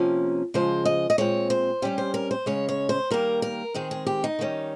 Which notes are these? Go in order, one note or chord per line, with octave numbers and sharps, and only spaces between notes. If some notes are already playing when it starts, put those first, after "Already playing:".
Already playing: C3 F3 A#3 C#4
C#3 F3 G#3 C5
D#5
D#5
A#2 G#3 C4 C#5
C5
C3 G3 C#4 G4
C5
A#4
C5
C#3 G#3 C#4 C#5
C#5
C5
D#3 G3 A#3 A#4
A#4
D#3 G#3 C4 G#4
G#4
G4
D#4
D#3 G3 A#3 C#4